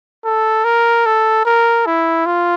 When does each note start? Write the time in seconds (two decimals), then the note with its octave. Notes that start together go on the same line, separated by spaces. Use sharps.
0.25 A4
0.65 A#4
1.06 A4
1.46 A#4
1.86 E4
2.26 F4